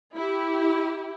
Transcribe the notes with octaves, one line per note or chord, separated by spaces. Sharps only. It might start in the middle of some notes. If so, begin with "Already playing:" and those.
E4 G4